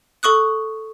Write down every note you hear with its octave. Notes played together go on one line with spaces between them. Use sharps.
A4 C#6 D#6 F#6